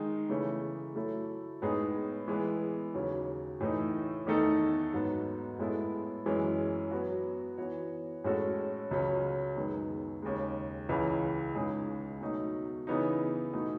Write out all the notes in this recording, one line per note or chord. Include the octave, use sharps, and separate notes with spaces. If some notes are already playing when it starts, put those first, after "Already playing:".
Already playing: D#3 G#3 D#4
C#3 E3 A3
F#3 A3 E4 A4
A2 G#3 B3 D#4 G#4
E3 G#3 B3
D#2 C#3 F#3
A2 E3 A3 D#4
E2 D#3 A3 D#4 A4
G#2 F#3 B3
A2 G#3 B3 E4 A4
F#2 E3 G#3 C#4
F#3 B3 F#4
E3 B3 F#4 C#5
A2 G#3 C#4 F#4 A4
C#2 C#3 F#3 C#4
F#2 D#3 G#3 B3
D#2 C#3 G#3
C#2 C#3 E3
C#2 C#3 G#3 D#4 G#4
B2 F#3 A3 D#4
C#3 E3 B3 D#4
B2 A3 D#4